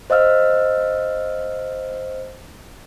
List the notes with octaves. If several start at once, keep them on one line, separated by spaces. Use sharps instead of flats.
C5 D#5 F5 E6 F6